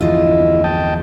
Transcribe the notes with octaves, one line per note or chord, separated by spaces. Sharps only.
G1 E2 F3 E4 F4 D#5
D#5 G5 A5